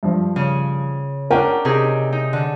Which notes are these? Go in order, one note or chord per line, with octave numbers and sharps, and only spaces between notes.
G2 F3
C#3
C#4 D4 A#4 F#5 G5
C3 D#4 G#4
D#4
D3